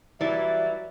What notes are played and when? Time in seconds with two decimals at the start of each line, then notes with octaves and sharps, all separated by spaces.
0.21 E3 F#3 G3 E4 D5 E5 A6